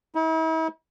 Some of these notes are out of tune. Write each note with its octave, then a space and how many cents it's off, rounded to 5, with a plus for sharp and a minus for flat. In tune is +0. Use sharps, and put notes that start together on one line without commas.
E4 -45